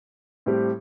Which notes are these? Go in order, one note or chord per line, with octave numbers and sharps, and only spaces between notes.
A2 G3 C4 G4